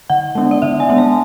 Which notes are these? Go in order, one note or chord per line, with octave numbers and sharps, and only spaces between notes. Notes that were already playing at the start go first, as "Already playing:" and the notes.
D3 F#5
G#3 B3 D4
D5
D3 E5
G#5
G#3 B3 D4
A5